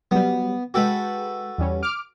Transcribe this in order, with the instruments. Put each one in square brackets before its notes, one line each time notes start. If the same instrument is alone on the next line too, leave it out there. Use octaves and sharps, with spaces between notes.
[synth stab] F#3 G3 [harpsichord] B3
[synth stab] G#3 G5 [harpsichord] F#4 A4 B4
[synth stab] E2 G3 C#4
D6 F6 D7